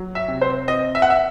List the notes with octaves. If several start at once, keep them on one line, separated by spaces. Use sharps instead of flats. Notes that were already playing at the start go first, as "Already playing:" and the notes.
Already playing: F#3
E5
C3
C5
C4 D#5
E5
F#5
E5